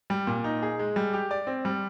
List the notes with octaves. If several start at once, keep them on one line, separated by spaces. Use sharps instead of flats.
G3
A#2
D#4
G#4
G#3
G3
G4
D5
C4
G3